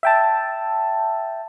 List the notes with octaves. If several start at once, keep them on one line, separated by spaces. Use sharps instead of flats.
E5 G5 A5